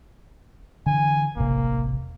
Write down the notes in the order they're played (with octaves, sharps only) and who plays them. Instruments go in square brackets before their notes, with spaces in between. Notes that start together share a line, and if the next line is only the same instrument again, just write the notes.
[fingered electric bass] D3 E3 [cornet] G#5
[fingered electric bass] E1 A1 C3 [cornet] A#3